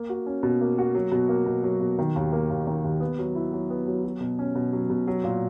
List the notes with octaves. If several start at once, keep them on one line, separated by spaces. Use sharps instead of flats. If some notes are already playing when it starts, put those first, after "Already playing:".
Already playing: A#3
F#4
C#4
B2
A#3
F#4
F#3
B2
A#3
B2
F#3
B2
D#3
D#2
A#3
D#2
D#3
D#2
B3
F#3
E4
F#3
B3
F#3
F#3
B2
C#4
B2
F#3
B2
F#3
A#2